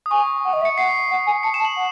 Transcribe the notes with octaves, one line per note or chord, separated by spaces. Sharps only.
D#6
G#5 C#6
F#5
D#5
E5
C#7
F#5 C7
F#5
G#5
A5 C#7
E7
A5
F#7
F#5